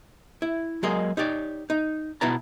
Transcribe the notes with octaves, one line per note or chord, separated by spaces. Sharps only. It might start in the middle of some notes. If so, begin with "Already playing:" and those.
E4
F#3 G#3 A#3 G#4 D#5
D#4 G4 C#5 D5
D#4
B2 B3 E4 B4 A5 A#5